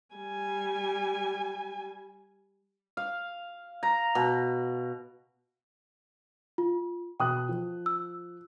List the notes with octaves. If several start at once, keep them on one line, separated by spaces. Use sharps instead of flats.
G3 G#5
F5
A#5
B2
F4
B2 G5 D#6 F#6
F3
E6